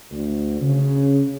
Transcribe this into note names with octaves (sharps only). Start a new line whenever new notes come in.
D2
C#3